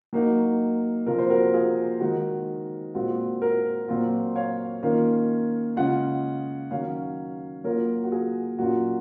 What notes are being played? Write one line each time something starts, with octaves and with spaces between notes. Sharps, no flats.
F#3 A#3 D#4
C3 F3 A#3 F4 A#4
C5
F#4 A#4
F4 G#4
D#3 G#3 D#4 F#4
A#2 G#3 C4 F4 F#4
F#4 A#4
A#2 F#3 C4 F4
C#5 F5
D#3 A#3 C#4 F4
C#3 G#3 C#4 F4 D#5 F#5
D#3 F#3 C#4 C#5 F5
F#3 A#3 F4 A#4 C#5
F#4
F4 G#4
A#2 F#3 C#4 F4 F#4